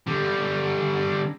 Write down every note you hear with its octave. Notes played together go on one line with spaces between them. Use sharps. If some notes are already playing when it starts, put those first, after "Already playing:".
D3 G3